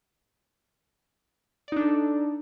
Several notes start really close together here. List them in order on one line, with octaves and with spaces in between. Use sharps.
D5 D#4 D4 A4